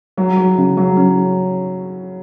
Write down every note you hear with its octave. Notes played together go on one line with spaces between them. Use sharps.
F#3
F#3
C#3
F#3
C#4